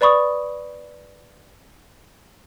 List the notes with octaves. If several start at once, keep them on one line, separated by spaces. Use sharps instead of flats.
B4 D5 B5 C#6 D#6